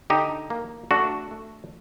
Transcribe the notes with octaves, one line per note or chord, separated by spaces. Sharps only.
D3 D#4 G4
A#3
A3 D4 F#4
A3